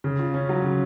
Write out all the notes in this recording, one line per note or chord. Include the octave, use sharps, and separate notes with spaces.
C#3
F4
C#4
F#3
C#3